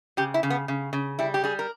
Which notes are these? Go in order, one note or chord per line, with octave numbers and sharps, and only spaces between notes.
C#3 G4
E4
C#3
B3
C#3
C#3
G3 E4
G4
G3 G#4
A#4